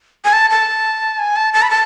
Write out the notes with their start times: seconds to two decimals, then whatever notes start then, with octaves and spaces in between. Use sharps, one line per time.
0.25 G#5
0.33 A5
0.50 A5
1.19 G#5
1.36 A5
1.54 A5
1.62 B5
1.70 A5